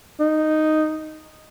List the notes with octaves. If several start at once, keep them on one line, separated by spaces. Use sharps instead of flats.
D#4